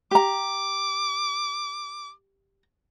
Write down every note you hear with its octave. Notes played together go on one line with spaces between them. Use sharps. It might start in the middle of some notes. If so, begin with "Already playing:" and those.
G4 A#5 D6